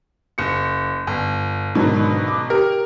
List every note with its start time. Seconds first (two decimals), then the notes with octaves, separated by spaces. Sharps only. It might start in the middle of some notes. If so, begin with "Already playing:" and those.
0.38 F#1 C#7
1.07 G1
1.75 G#2 B2 D3 D#3 F#3 D4
2.28 D6
2.50 G4 A#4